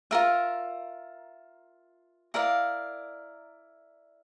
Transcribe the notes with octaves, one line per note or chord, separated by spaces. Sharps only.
F4 A#4 E5
E4 A#4 D5 F5